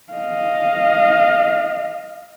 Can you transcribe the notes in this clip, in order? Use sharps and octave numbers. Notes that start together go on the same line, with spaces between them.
D#5 F5